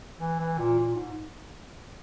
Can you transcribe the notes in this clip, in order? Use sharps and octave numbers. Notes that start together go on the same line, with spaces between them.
E3
E3
A#2
A#2
G#2